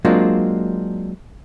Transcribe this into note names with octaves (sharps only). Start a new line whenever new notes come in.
F#3 G#3 A#3 C4 D4 F4